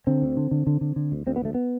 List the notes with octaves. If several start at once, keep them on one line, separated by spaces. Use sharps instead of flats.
D3 C4
D2
D3
D3
D3
D3
D3
D2
D2 C4
B3
D2 A3
B3